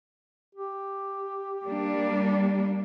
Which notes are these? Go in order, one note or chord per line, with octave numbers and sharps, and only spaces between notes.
G4
G3 A#3 D4